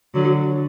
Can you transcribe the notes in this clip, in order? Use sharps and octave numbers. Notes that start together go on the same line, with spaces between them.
D3 F#3